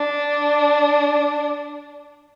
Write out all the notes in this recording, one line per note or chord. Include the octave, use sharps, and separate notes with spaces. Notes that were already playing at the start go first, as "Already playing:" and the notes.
Already playing: D4